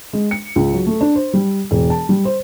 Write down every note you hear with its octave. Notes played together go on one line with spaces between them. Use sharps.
G#3
C#7
C#2
F#3
A3
D4
C5
G3
E1
A5
G3
C5